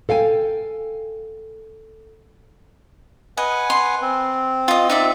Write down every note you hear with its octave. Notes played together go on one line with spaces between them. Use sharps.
A4 F5 G5 G#5
B4 D#5 F#5 G#5
C6
C4
F4 D#5
D#4 D5 E5